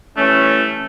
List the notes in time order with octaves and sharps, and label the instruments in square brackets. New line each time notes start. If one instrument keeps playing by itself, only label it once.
[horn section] E3 G3 C#4 [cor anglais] A3